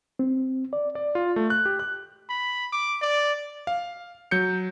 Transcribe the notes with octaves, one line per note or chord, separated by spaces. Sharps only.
C4
D5
D5
F4
A3
F#6
G4
F#6
B5
D6
D5
F5
F#3 G6 C#7